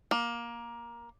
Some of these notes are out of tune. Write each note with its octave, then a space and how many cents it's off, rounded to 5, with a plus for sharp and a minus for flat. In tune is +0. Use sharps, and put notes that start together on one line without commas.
A#3 +15